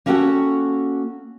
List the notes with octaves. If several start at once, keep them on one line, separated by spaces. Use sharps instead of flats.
A#3 C#4 F#4 A4 F#5 G5